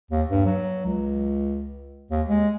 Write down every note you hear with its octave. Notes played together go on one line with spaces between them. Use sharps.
D#2
G2
F#3
C#2
D#2
G#3